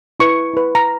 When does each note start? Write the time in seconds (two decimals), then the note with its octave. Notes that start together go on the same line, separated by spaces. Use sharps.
0.20 E4 B4 C#6
0.53 E4 B4
0.75 A#5